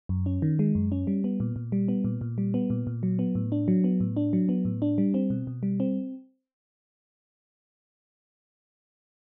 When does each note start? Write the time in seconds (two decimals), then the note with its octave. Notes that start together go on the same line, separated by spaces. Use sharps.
0.09 F#2
0.26 C#4
0.42 D#3
0.59 G#3
0.75 F#2
0.92 C#4
1.07 G3
1.24 B3
1.40 A#2
1.56 A#2
1.72 G3
1.88 B3
2.04 A#2
2.21 A#2
2.38 G3
2.54 B3
2.70 A#2
2.87 A#2
3.03 F#3
3.19 B3
3.35 A2
3.52 D4
3.68 F#3
3.84 B3
4.00 A2
4.17 D4
4.33 F#3
4.49 B3
4.65 A2
4.82 D4
4.98 G3
5.14 C4
5.30 B2
5.47 B2
5.63 G3
5.80 C4